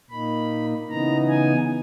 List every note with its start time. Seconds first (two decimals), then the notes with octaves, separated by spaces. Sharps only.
0.11 A#2 A#3 D#4 B5
0.90 C#3 E3 B3 D#4 A#5
1.29 G#5